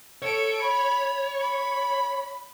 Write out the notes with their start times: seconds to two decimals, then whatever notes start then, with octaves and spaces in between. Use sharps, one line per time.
0.22 A4 C#5 D7
0.61 B5
1.40 B5